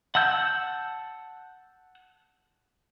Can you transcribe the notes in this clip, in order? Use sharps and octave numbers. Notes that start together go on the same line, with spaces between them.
F#5 A5 E6 G6